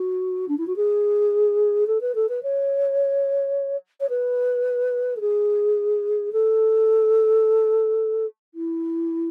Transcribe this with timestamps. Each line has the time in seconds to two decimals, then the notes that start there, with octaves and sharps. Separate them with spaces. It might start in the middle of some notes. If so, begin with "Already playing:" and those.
Already playing: F#4
0.48 D4
0.58 E4
0.67 F#4
0.76 G#4
1.87 A4
2.01 B4
2.15 A4
2.29 B4
2.43 C#5
4.00 C#5
4.09 B4
5.17 A4
5.21 G#4
6.33 A4
8.54 E4